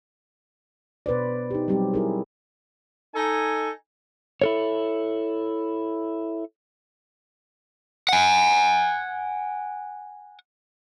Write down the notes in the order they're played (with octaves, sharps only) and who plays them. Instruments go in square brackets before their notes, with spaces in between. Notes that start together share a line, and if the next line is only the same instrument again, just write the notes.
[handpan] B2 B4 C5 D5
D#4 G4
F#3 G3 C4 G4
E4 G#4 A#4
[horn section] D#4 A4 G#5
[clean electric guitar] E4 A4 C#5
[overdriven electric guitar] F#5 G#5